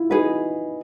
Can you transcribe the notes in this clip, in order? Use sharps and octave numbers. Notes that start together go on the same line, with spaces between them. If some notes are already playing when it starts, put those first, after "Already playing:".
Already playing: E4 F4
D#4 F#4 G#4 B4